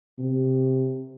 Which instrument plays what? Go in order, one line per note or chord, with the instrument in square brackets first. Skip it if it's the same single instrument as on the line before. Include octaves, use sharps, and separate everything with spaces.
[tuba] C3